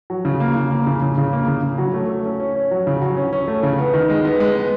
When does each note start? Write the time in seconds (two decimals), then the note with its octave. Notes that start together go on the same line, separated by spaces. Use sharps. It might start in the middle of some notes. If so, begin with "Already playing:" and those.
0.10 F#3
0.25 C#3
0.40 A#3
0.56 C#3
0.71 A#3
0.87 C#3
1.02 C#3
1.18 C#3
1.33 A#3
1.48 C#3
1.63 C#3
1.78 F#3
1.94 A3
2.09 A3
2.25 C#4
2.40 C#4
2.55 C#4
2.71 F#3
2.87 C#3
3.02 F#3
3.17 C#4
3.33 C#4
3.48 A3
3.63 C#3
3.78 B3
3.94 D#3
4.10 G#3
4.25 B3
4.40 G#3
4.56 B3